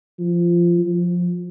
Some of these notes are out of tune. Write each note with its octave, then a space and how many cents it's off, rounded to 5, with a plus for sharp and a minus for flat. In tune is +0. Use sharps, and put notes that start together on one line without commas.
F3 -15
F3 +15